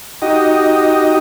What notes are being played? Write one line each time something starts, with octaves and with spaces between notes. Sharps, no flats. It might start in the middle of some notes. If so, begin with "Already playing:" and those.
D#4 F#4 G4 D#5